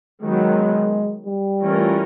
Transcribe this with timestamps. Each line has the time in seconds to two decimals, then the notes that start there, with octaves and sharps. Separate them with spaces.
0.23 D#3 F#3 G#3 B3
1.26 G3
1.61 E3 A3 C#4 F4 A#4